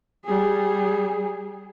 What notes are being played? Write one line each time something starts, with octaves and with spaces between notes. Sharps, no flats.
G3 G#4